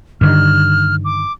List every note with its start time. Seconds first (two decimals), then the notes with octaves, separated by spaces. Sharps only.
0.21 G2 D3 D#3 F6
1.05 D6